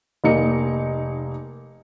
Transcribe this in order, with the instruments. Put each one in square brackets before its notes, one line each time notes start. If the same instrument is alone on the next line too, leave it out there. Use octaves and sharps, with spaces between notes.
[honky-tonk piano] F1 A#3 D#4 C#7